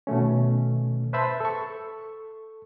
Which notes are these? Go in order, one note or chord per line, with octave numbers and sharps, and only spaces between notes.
B2 D#3 A3 C#4
B4 C5 E5 A5 B5
A4 C#6